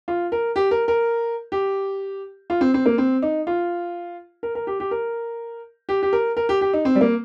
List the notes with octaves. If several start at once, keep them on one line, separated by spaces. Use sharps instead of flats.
F4
A#4
G4
A#4
A#4
G4
F4
C4
C4
A#3
C4
D#4
F4
A#4
A#4
G4
G4
A#4
G4
G4
A#4
A#4
G4
G4
D#4
C4
G3
A#3